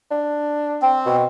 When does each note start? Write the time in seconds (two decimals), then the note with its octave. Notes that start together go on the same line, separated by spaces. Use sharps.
0.11 D4
0.82 C4
1.06 B2